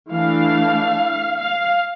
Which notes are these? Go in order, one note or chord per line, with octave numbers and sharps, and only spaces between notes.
E3 A3 D4 F5
F5